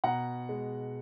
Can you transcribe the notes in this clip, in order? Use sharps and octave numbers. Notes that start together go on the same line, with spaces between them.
B2 F#5 A#5
G#3